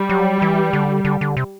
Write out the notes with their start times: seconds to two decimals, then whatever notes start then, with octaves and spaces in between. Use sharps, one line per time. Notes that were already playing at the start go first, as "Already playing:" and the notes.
Already playing: G3
0.09 F#3
0.42 E3
0.73 D3
1.05 D3
1.21 D3
1.37 C3